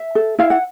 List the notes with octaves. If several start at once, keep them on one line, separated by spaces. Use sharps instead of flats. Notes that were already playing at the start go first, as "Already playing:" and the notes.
Already playing: E5
A4
E4 F5
F#5